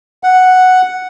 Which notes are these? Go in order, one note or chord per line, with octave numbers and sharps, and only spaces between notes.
F#5